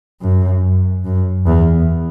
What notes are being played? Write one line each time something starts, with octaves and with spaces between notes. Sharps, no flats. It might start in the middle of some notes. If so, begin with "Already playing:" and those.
F#2
F#2
E2